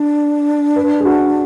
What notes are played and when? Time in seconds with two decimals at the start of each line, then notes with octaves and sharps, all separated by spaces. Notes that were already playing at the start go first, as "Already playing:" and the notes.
Already playing: D4
0.76 B4
1.00 G#4
1.05 F#4